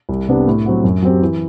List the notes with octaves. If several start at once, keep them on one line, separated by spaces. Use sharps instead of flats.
C2
C3 G3 B3 D4
A2
F#3 C4 F#4
F#2
F#3 C4 G4
E3